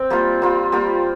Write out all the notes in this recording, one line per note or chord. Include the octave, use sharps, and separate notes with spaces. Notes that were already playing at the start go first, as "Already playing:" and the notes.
Already playing: C4 G5
G3 A#3 F4
G3 A#3 F4
G3 A#3 F4 G5